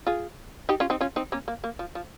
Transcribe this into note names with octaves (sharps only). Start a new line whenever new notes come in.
F4 G#4
D#4 G4
C#4 F4
C4 D#4
C#4 F4
C4 D#4
A#3 C#4
A#3
A#3
F3
F3